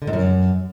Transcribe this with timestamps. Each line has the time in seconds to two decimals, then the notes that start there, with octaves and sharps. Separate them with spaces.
0.02 D3
0.07 G#2
0.13 F#2